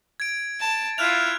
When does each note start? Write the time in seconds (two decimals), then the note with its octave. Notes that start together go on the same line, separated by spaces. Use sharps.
0.20 G#6 D7
0.60 A5
0.98 E4 F4 F6 F#6 F7